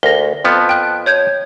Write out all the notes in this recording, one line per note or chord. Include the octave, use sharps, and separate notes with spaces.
D2 A#4 A#6
F2 F3 B3
G5 F#6
C#5 G6 G#6